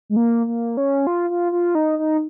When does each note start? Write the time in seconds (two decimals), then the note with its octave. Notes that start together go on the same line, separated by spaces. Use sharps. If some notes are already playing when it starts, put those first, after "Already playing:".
0.09 G#3
0.16 A#3
0.47 A#3
0.77 C#4
1.07 F4
1.30 F4
1.52 F4
1.75 D#4
1.99 D#4